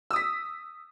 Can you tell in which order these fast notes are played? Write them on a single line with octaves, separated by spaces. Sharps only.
E6 D#6 B6